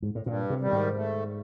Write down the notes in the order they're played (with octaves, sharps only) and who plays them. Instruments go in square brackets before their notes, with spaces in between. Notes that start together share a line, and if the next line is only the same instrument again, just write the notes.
[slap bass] G#2
A2
[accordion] G2 [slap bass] A#2
[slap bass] C3
[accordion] D#3 G3
[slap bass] G#2
[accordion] A3